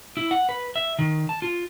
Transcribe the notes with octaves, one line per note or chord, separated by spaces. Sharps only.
E4
F#5
B4
E5
D#3
A5
F4